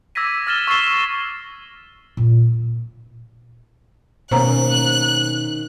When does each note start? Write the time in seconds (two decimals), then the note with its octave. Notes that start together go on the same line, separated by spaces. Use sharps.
0.15 D6 E6 G#6 A#6 B6 D#7
0.46 D6 E6 F6 A6 E7 G7
0.67 C#6 E6 A6 C7 E7 G7
2.17 A#2 F4
4.31 B2 D#3 A#3 C#4 C5 A#5 F#6